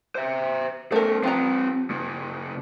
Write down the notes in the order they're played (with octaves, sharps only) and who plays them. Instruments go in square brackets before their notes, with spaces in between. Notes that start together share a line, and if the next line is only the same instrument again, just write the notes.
[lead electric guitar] C5 E5
[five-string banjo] A3 A#4 [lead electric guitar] C#4 C5
[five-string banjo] F3 G4 A#5 [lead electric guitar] C4 B4
[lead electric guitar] C#3 A#3